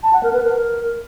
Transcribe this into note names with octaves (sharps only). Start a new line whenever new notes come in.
A5
F#5
A#4
B4
A#4